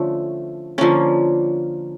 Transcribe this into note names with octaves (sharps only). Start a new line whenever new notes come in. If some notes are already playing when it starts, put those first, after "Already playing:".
Already playing: D3 F3 A3 C#4
D3 F3 A#3 C#4